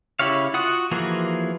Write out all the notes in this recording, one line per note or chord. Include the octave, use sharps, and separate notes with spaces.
C#3 E4 G4 C#5 F5
F4 F#4 F#5 D#6
E3 F3 A#3 F#4 G#4